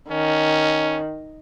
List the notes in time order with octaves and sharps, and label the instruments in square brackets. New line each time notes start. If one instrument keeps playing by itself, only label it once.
[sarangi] D#3 [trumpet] C#4